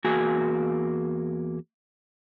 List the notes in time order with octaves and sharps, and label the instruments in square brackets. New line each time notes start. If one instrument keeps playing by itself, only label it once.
[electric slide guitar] E2 A#3 F#4 G#4 G#5